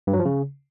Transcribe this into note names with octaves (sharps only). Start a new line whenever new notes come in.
G2
F#3
F3
C#3